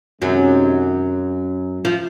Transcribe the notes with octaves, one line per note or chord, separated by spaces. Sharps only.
F#2 C3 D#3 F#3 G#3 C#4
F3